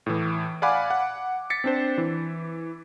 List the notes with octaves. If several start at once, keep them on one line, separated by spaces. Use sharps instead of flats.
A2 E3
D5 F5 F#5 G#5 B5 D6
F#5
A6 B6 C#7
C4 D4 C5
E3